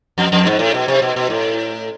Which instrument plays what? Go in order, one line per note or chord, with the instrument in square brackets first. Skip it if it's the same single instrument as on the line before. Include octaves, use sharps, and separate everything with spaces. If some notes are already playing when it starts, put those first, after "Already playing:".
[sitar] F2
F2
G#2
A2
B2
C3
B2
B2
A2